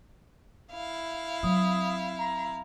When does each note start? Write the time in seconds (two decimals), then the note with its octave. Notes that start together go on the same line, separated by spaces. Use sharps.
0.73 E4 F5
1.43 F#3 C4 D#6
2.19 A#5